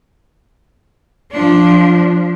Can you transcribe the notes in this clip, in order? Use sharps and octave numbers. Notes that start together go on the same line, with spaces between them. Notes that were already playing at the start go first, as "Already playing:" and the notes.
F3 D4